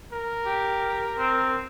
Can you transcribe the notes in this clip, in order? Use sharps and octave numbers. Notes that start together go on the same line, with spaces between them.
A#4
G4
C4